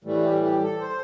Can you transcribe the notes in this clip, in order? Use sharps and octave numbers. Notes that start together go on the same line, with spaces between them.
A2 E3 G3 A3
G4
G4
A4
C5